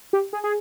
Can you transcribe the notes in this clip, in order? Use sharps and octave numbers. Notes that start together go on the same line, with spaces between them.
G4
G#4
G#4